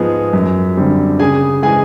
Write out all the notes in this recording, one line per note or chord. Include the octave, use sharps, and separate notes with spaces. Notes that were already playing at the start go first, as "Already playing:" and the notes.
Already playing: G#2 F3 G#3 B3 G#4
F#2
D3 G3 C4
C#3 G#4 G#5
E3 G#3 G#4 G#5